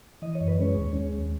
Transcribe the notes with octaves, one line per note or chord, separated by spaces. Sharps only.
E3 D#5
C#5
F#2
B4
G#3 C#4 C#5
D#2
G#3
D#2